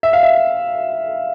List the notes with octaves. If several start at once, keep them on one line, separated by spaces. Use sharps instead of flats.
E5
F5
E5